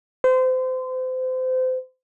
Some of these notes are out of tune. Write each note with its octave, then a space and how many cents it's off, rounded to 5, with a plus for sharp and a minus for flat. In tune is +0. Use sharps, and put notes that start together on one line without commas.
C5 -30